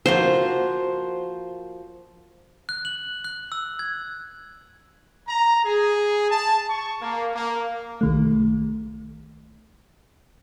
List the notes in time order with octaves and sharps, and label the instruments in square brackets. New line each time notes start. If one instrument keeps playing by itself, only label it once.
[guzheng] F3 A#3 F#4 [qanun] C5
[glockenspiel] F#6
F#7
F#6
E6
G#6
[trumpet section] A#5
G#4
A5
C#6
A#3
A#3
[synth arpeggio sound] B1 D#3 A3